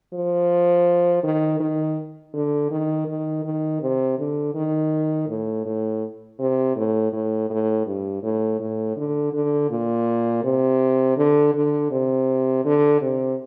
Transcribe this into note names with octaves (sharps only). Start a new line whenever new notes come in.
F3
D#3
D#3
D3
D#3
D#3
D#3
C3
D3
D#3
A2
A2
C3
A2
A2
A2
G2
A2
A2
D3
D3
A#2
C3
D3
D3
C3
D3
C3